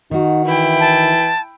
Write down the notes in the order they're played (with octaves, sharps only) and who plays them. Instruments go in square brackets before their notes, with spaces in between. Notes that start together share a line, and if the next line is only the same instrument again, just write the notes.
[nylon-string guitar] D#3 F#4 [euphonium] D#4
[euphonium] E3 [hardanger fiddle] E4 G5
[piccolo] A5